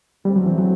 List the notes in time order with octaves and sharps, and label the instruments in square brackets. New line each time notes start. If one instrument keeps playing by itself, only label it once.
[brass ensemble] E2 D3 A3 C4 E4 [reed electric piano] G3
[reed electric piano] F#3
E3
F#3